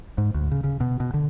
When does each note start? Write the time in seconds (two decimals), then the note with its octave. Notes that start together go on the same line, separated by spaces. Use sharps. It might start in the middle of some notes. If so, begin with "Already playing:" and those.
0.18 G#2
0.34 D2
0.51 C#3
0.64 C#3
0.80 B2
1.00 B2
1.14 D3